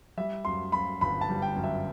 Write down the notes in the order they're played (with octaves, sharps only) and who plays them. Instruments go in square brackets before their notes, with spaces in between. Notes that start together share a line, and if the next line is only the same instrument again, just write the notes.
[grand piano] G3 E5
F#2 C6
F#2 B5
G1 B5
A5
G3
G5
F#2
E5